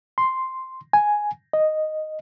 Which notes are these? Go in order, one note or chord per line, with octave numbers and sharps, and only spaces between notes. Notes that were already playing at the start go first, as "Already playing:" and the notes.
C6
G#5
D#5